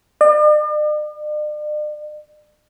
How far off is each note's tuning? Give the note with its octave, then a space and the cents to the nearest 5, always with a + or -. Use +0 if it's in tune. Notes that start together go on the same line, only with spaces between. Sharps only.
D5 +45